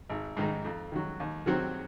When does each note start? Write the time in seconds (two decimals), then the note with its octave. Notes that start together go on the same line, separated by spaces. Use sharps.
0.09 G#1
0.37 G#2 D#3 G#3 D#4
0.65 F2
0.92 D#3 F#3
1.20 D#2
1.46 D#3 F#3 C4 F#4